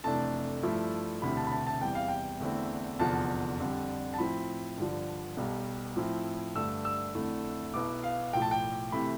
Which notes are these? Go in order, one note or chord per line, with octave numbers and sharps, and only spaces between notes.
F1 F2 E3 A3 D4 A5
G2 F3 A3 E4
E1 D2 C3 E3 A3 B5
A5
B5
A5
A5
E2 C3 E3 G3 G5
F5
G5
E2 D3 A3 C4 E4
F1 E2 D3 F3 A5
F2 D3 G3
A5
A2 F3 C4 E4 B5
G2 D3 F3
B1 B2 G3
A2 F3 C4 E4
G2 D3 A3 E6
E6
F2 D3 A3 E4
B1 B2 B3 E4 D6
F5
B1 A2 F3 G5
A5
G5
C3 E3 A3 B5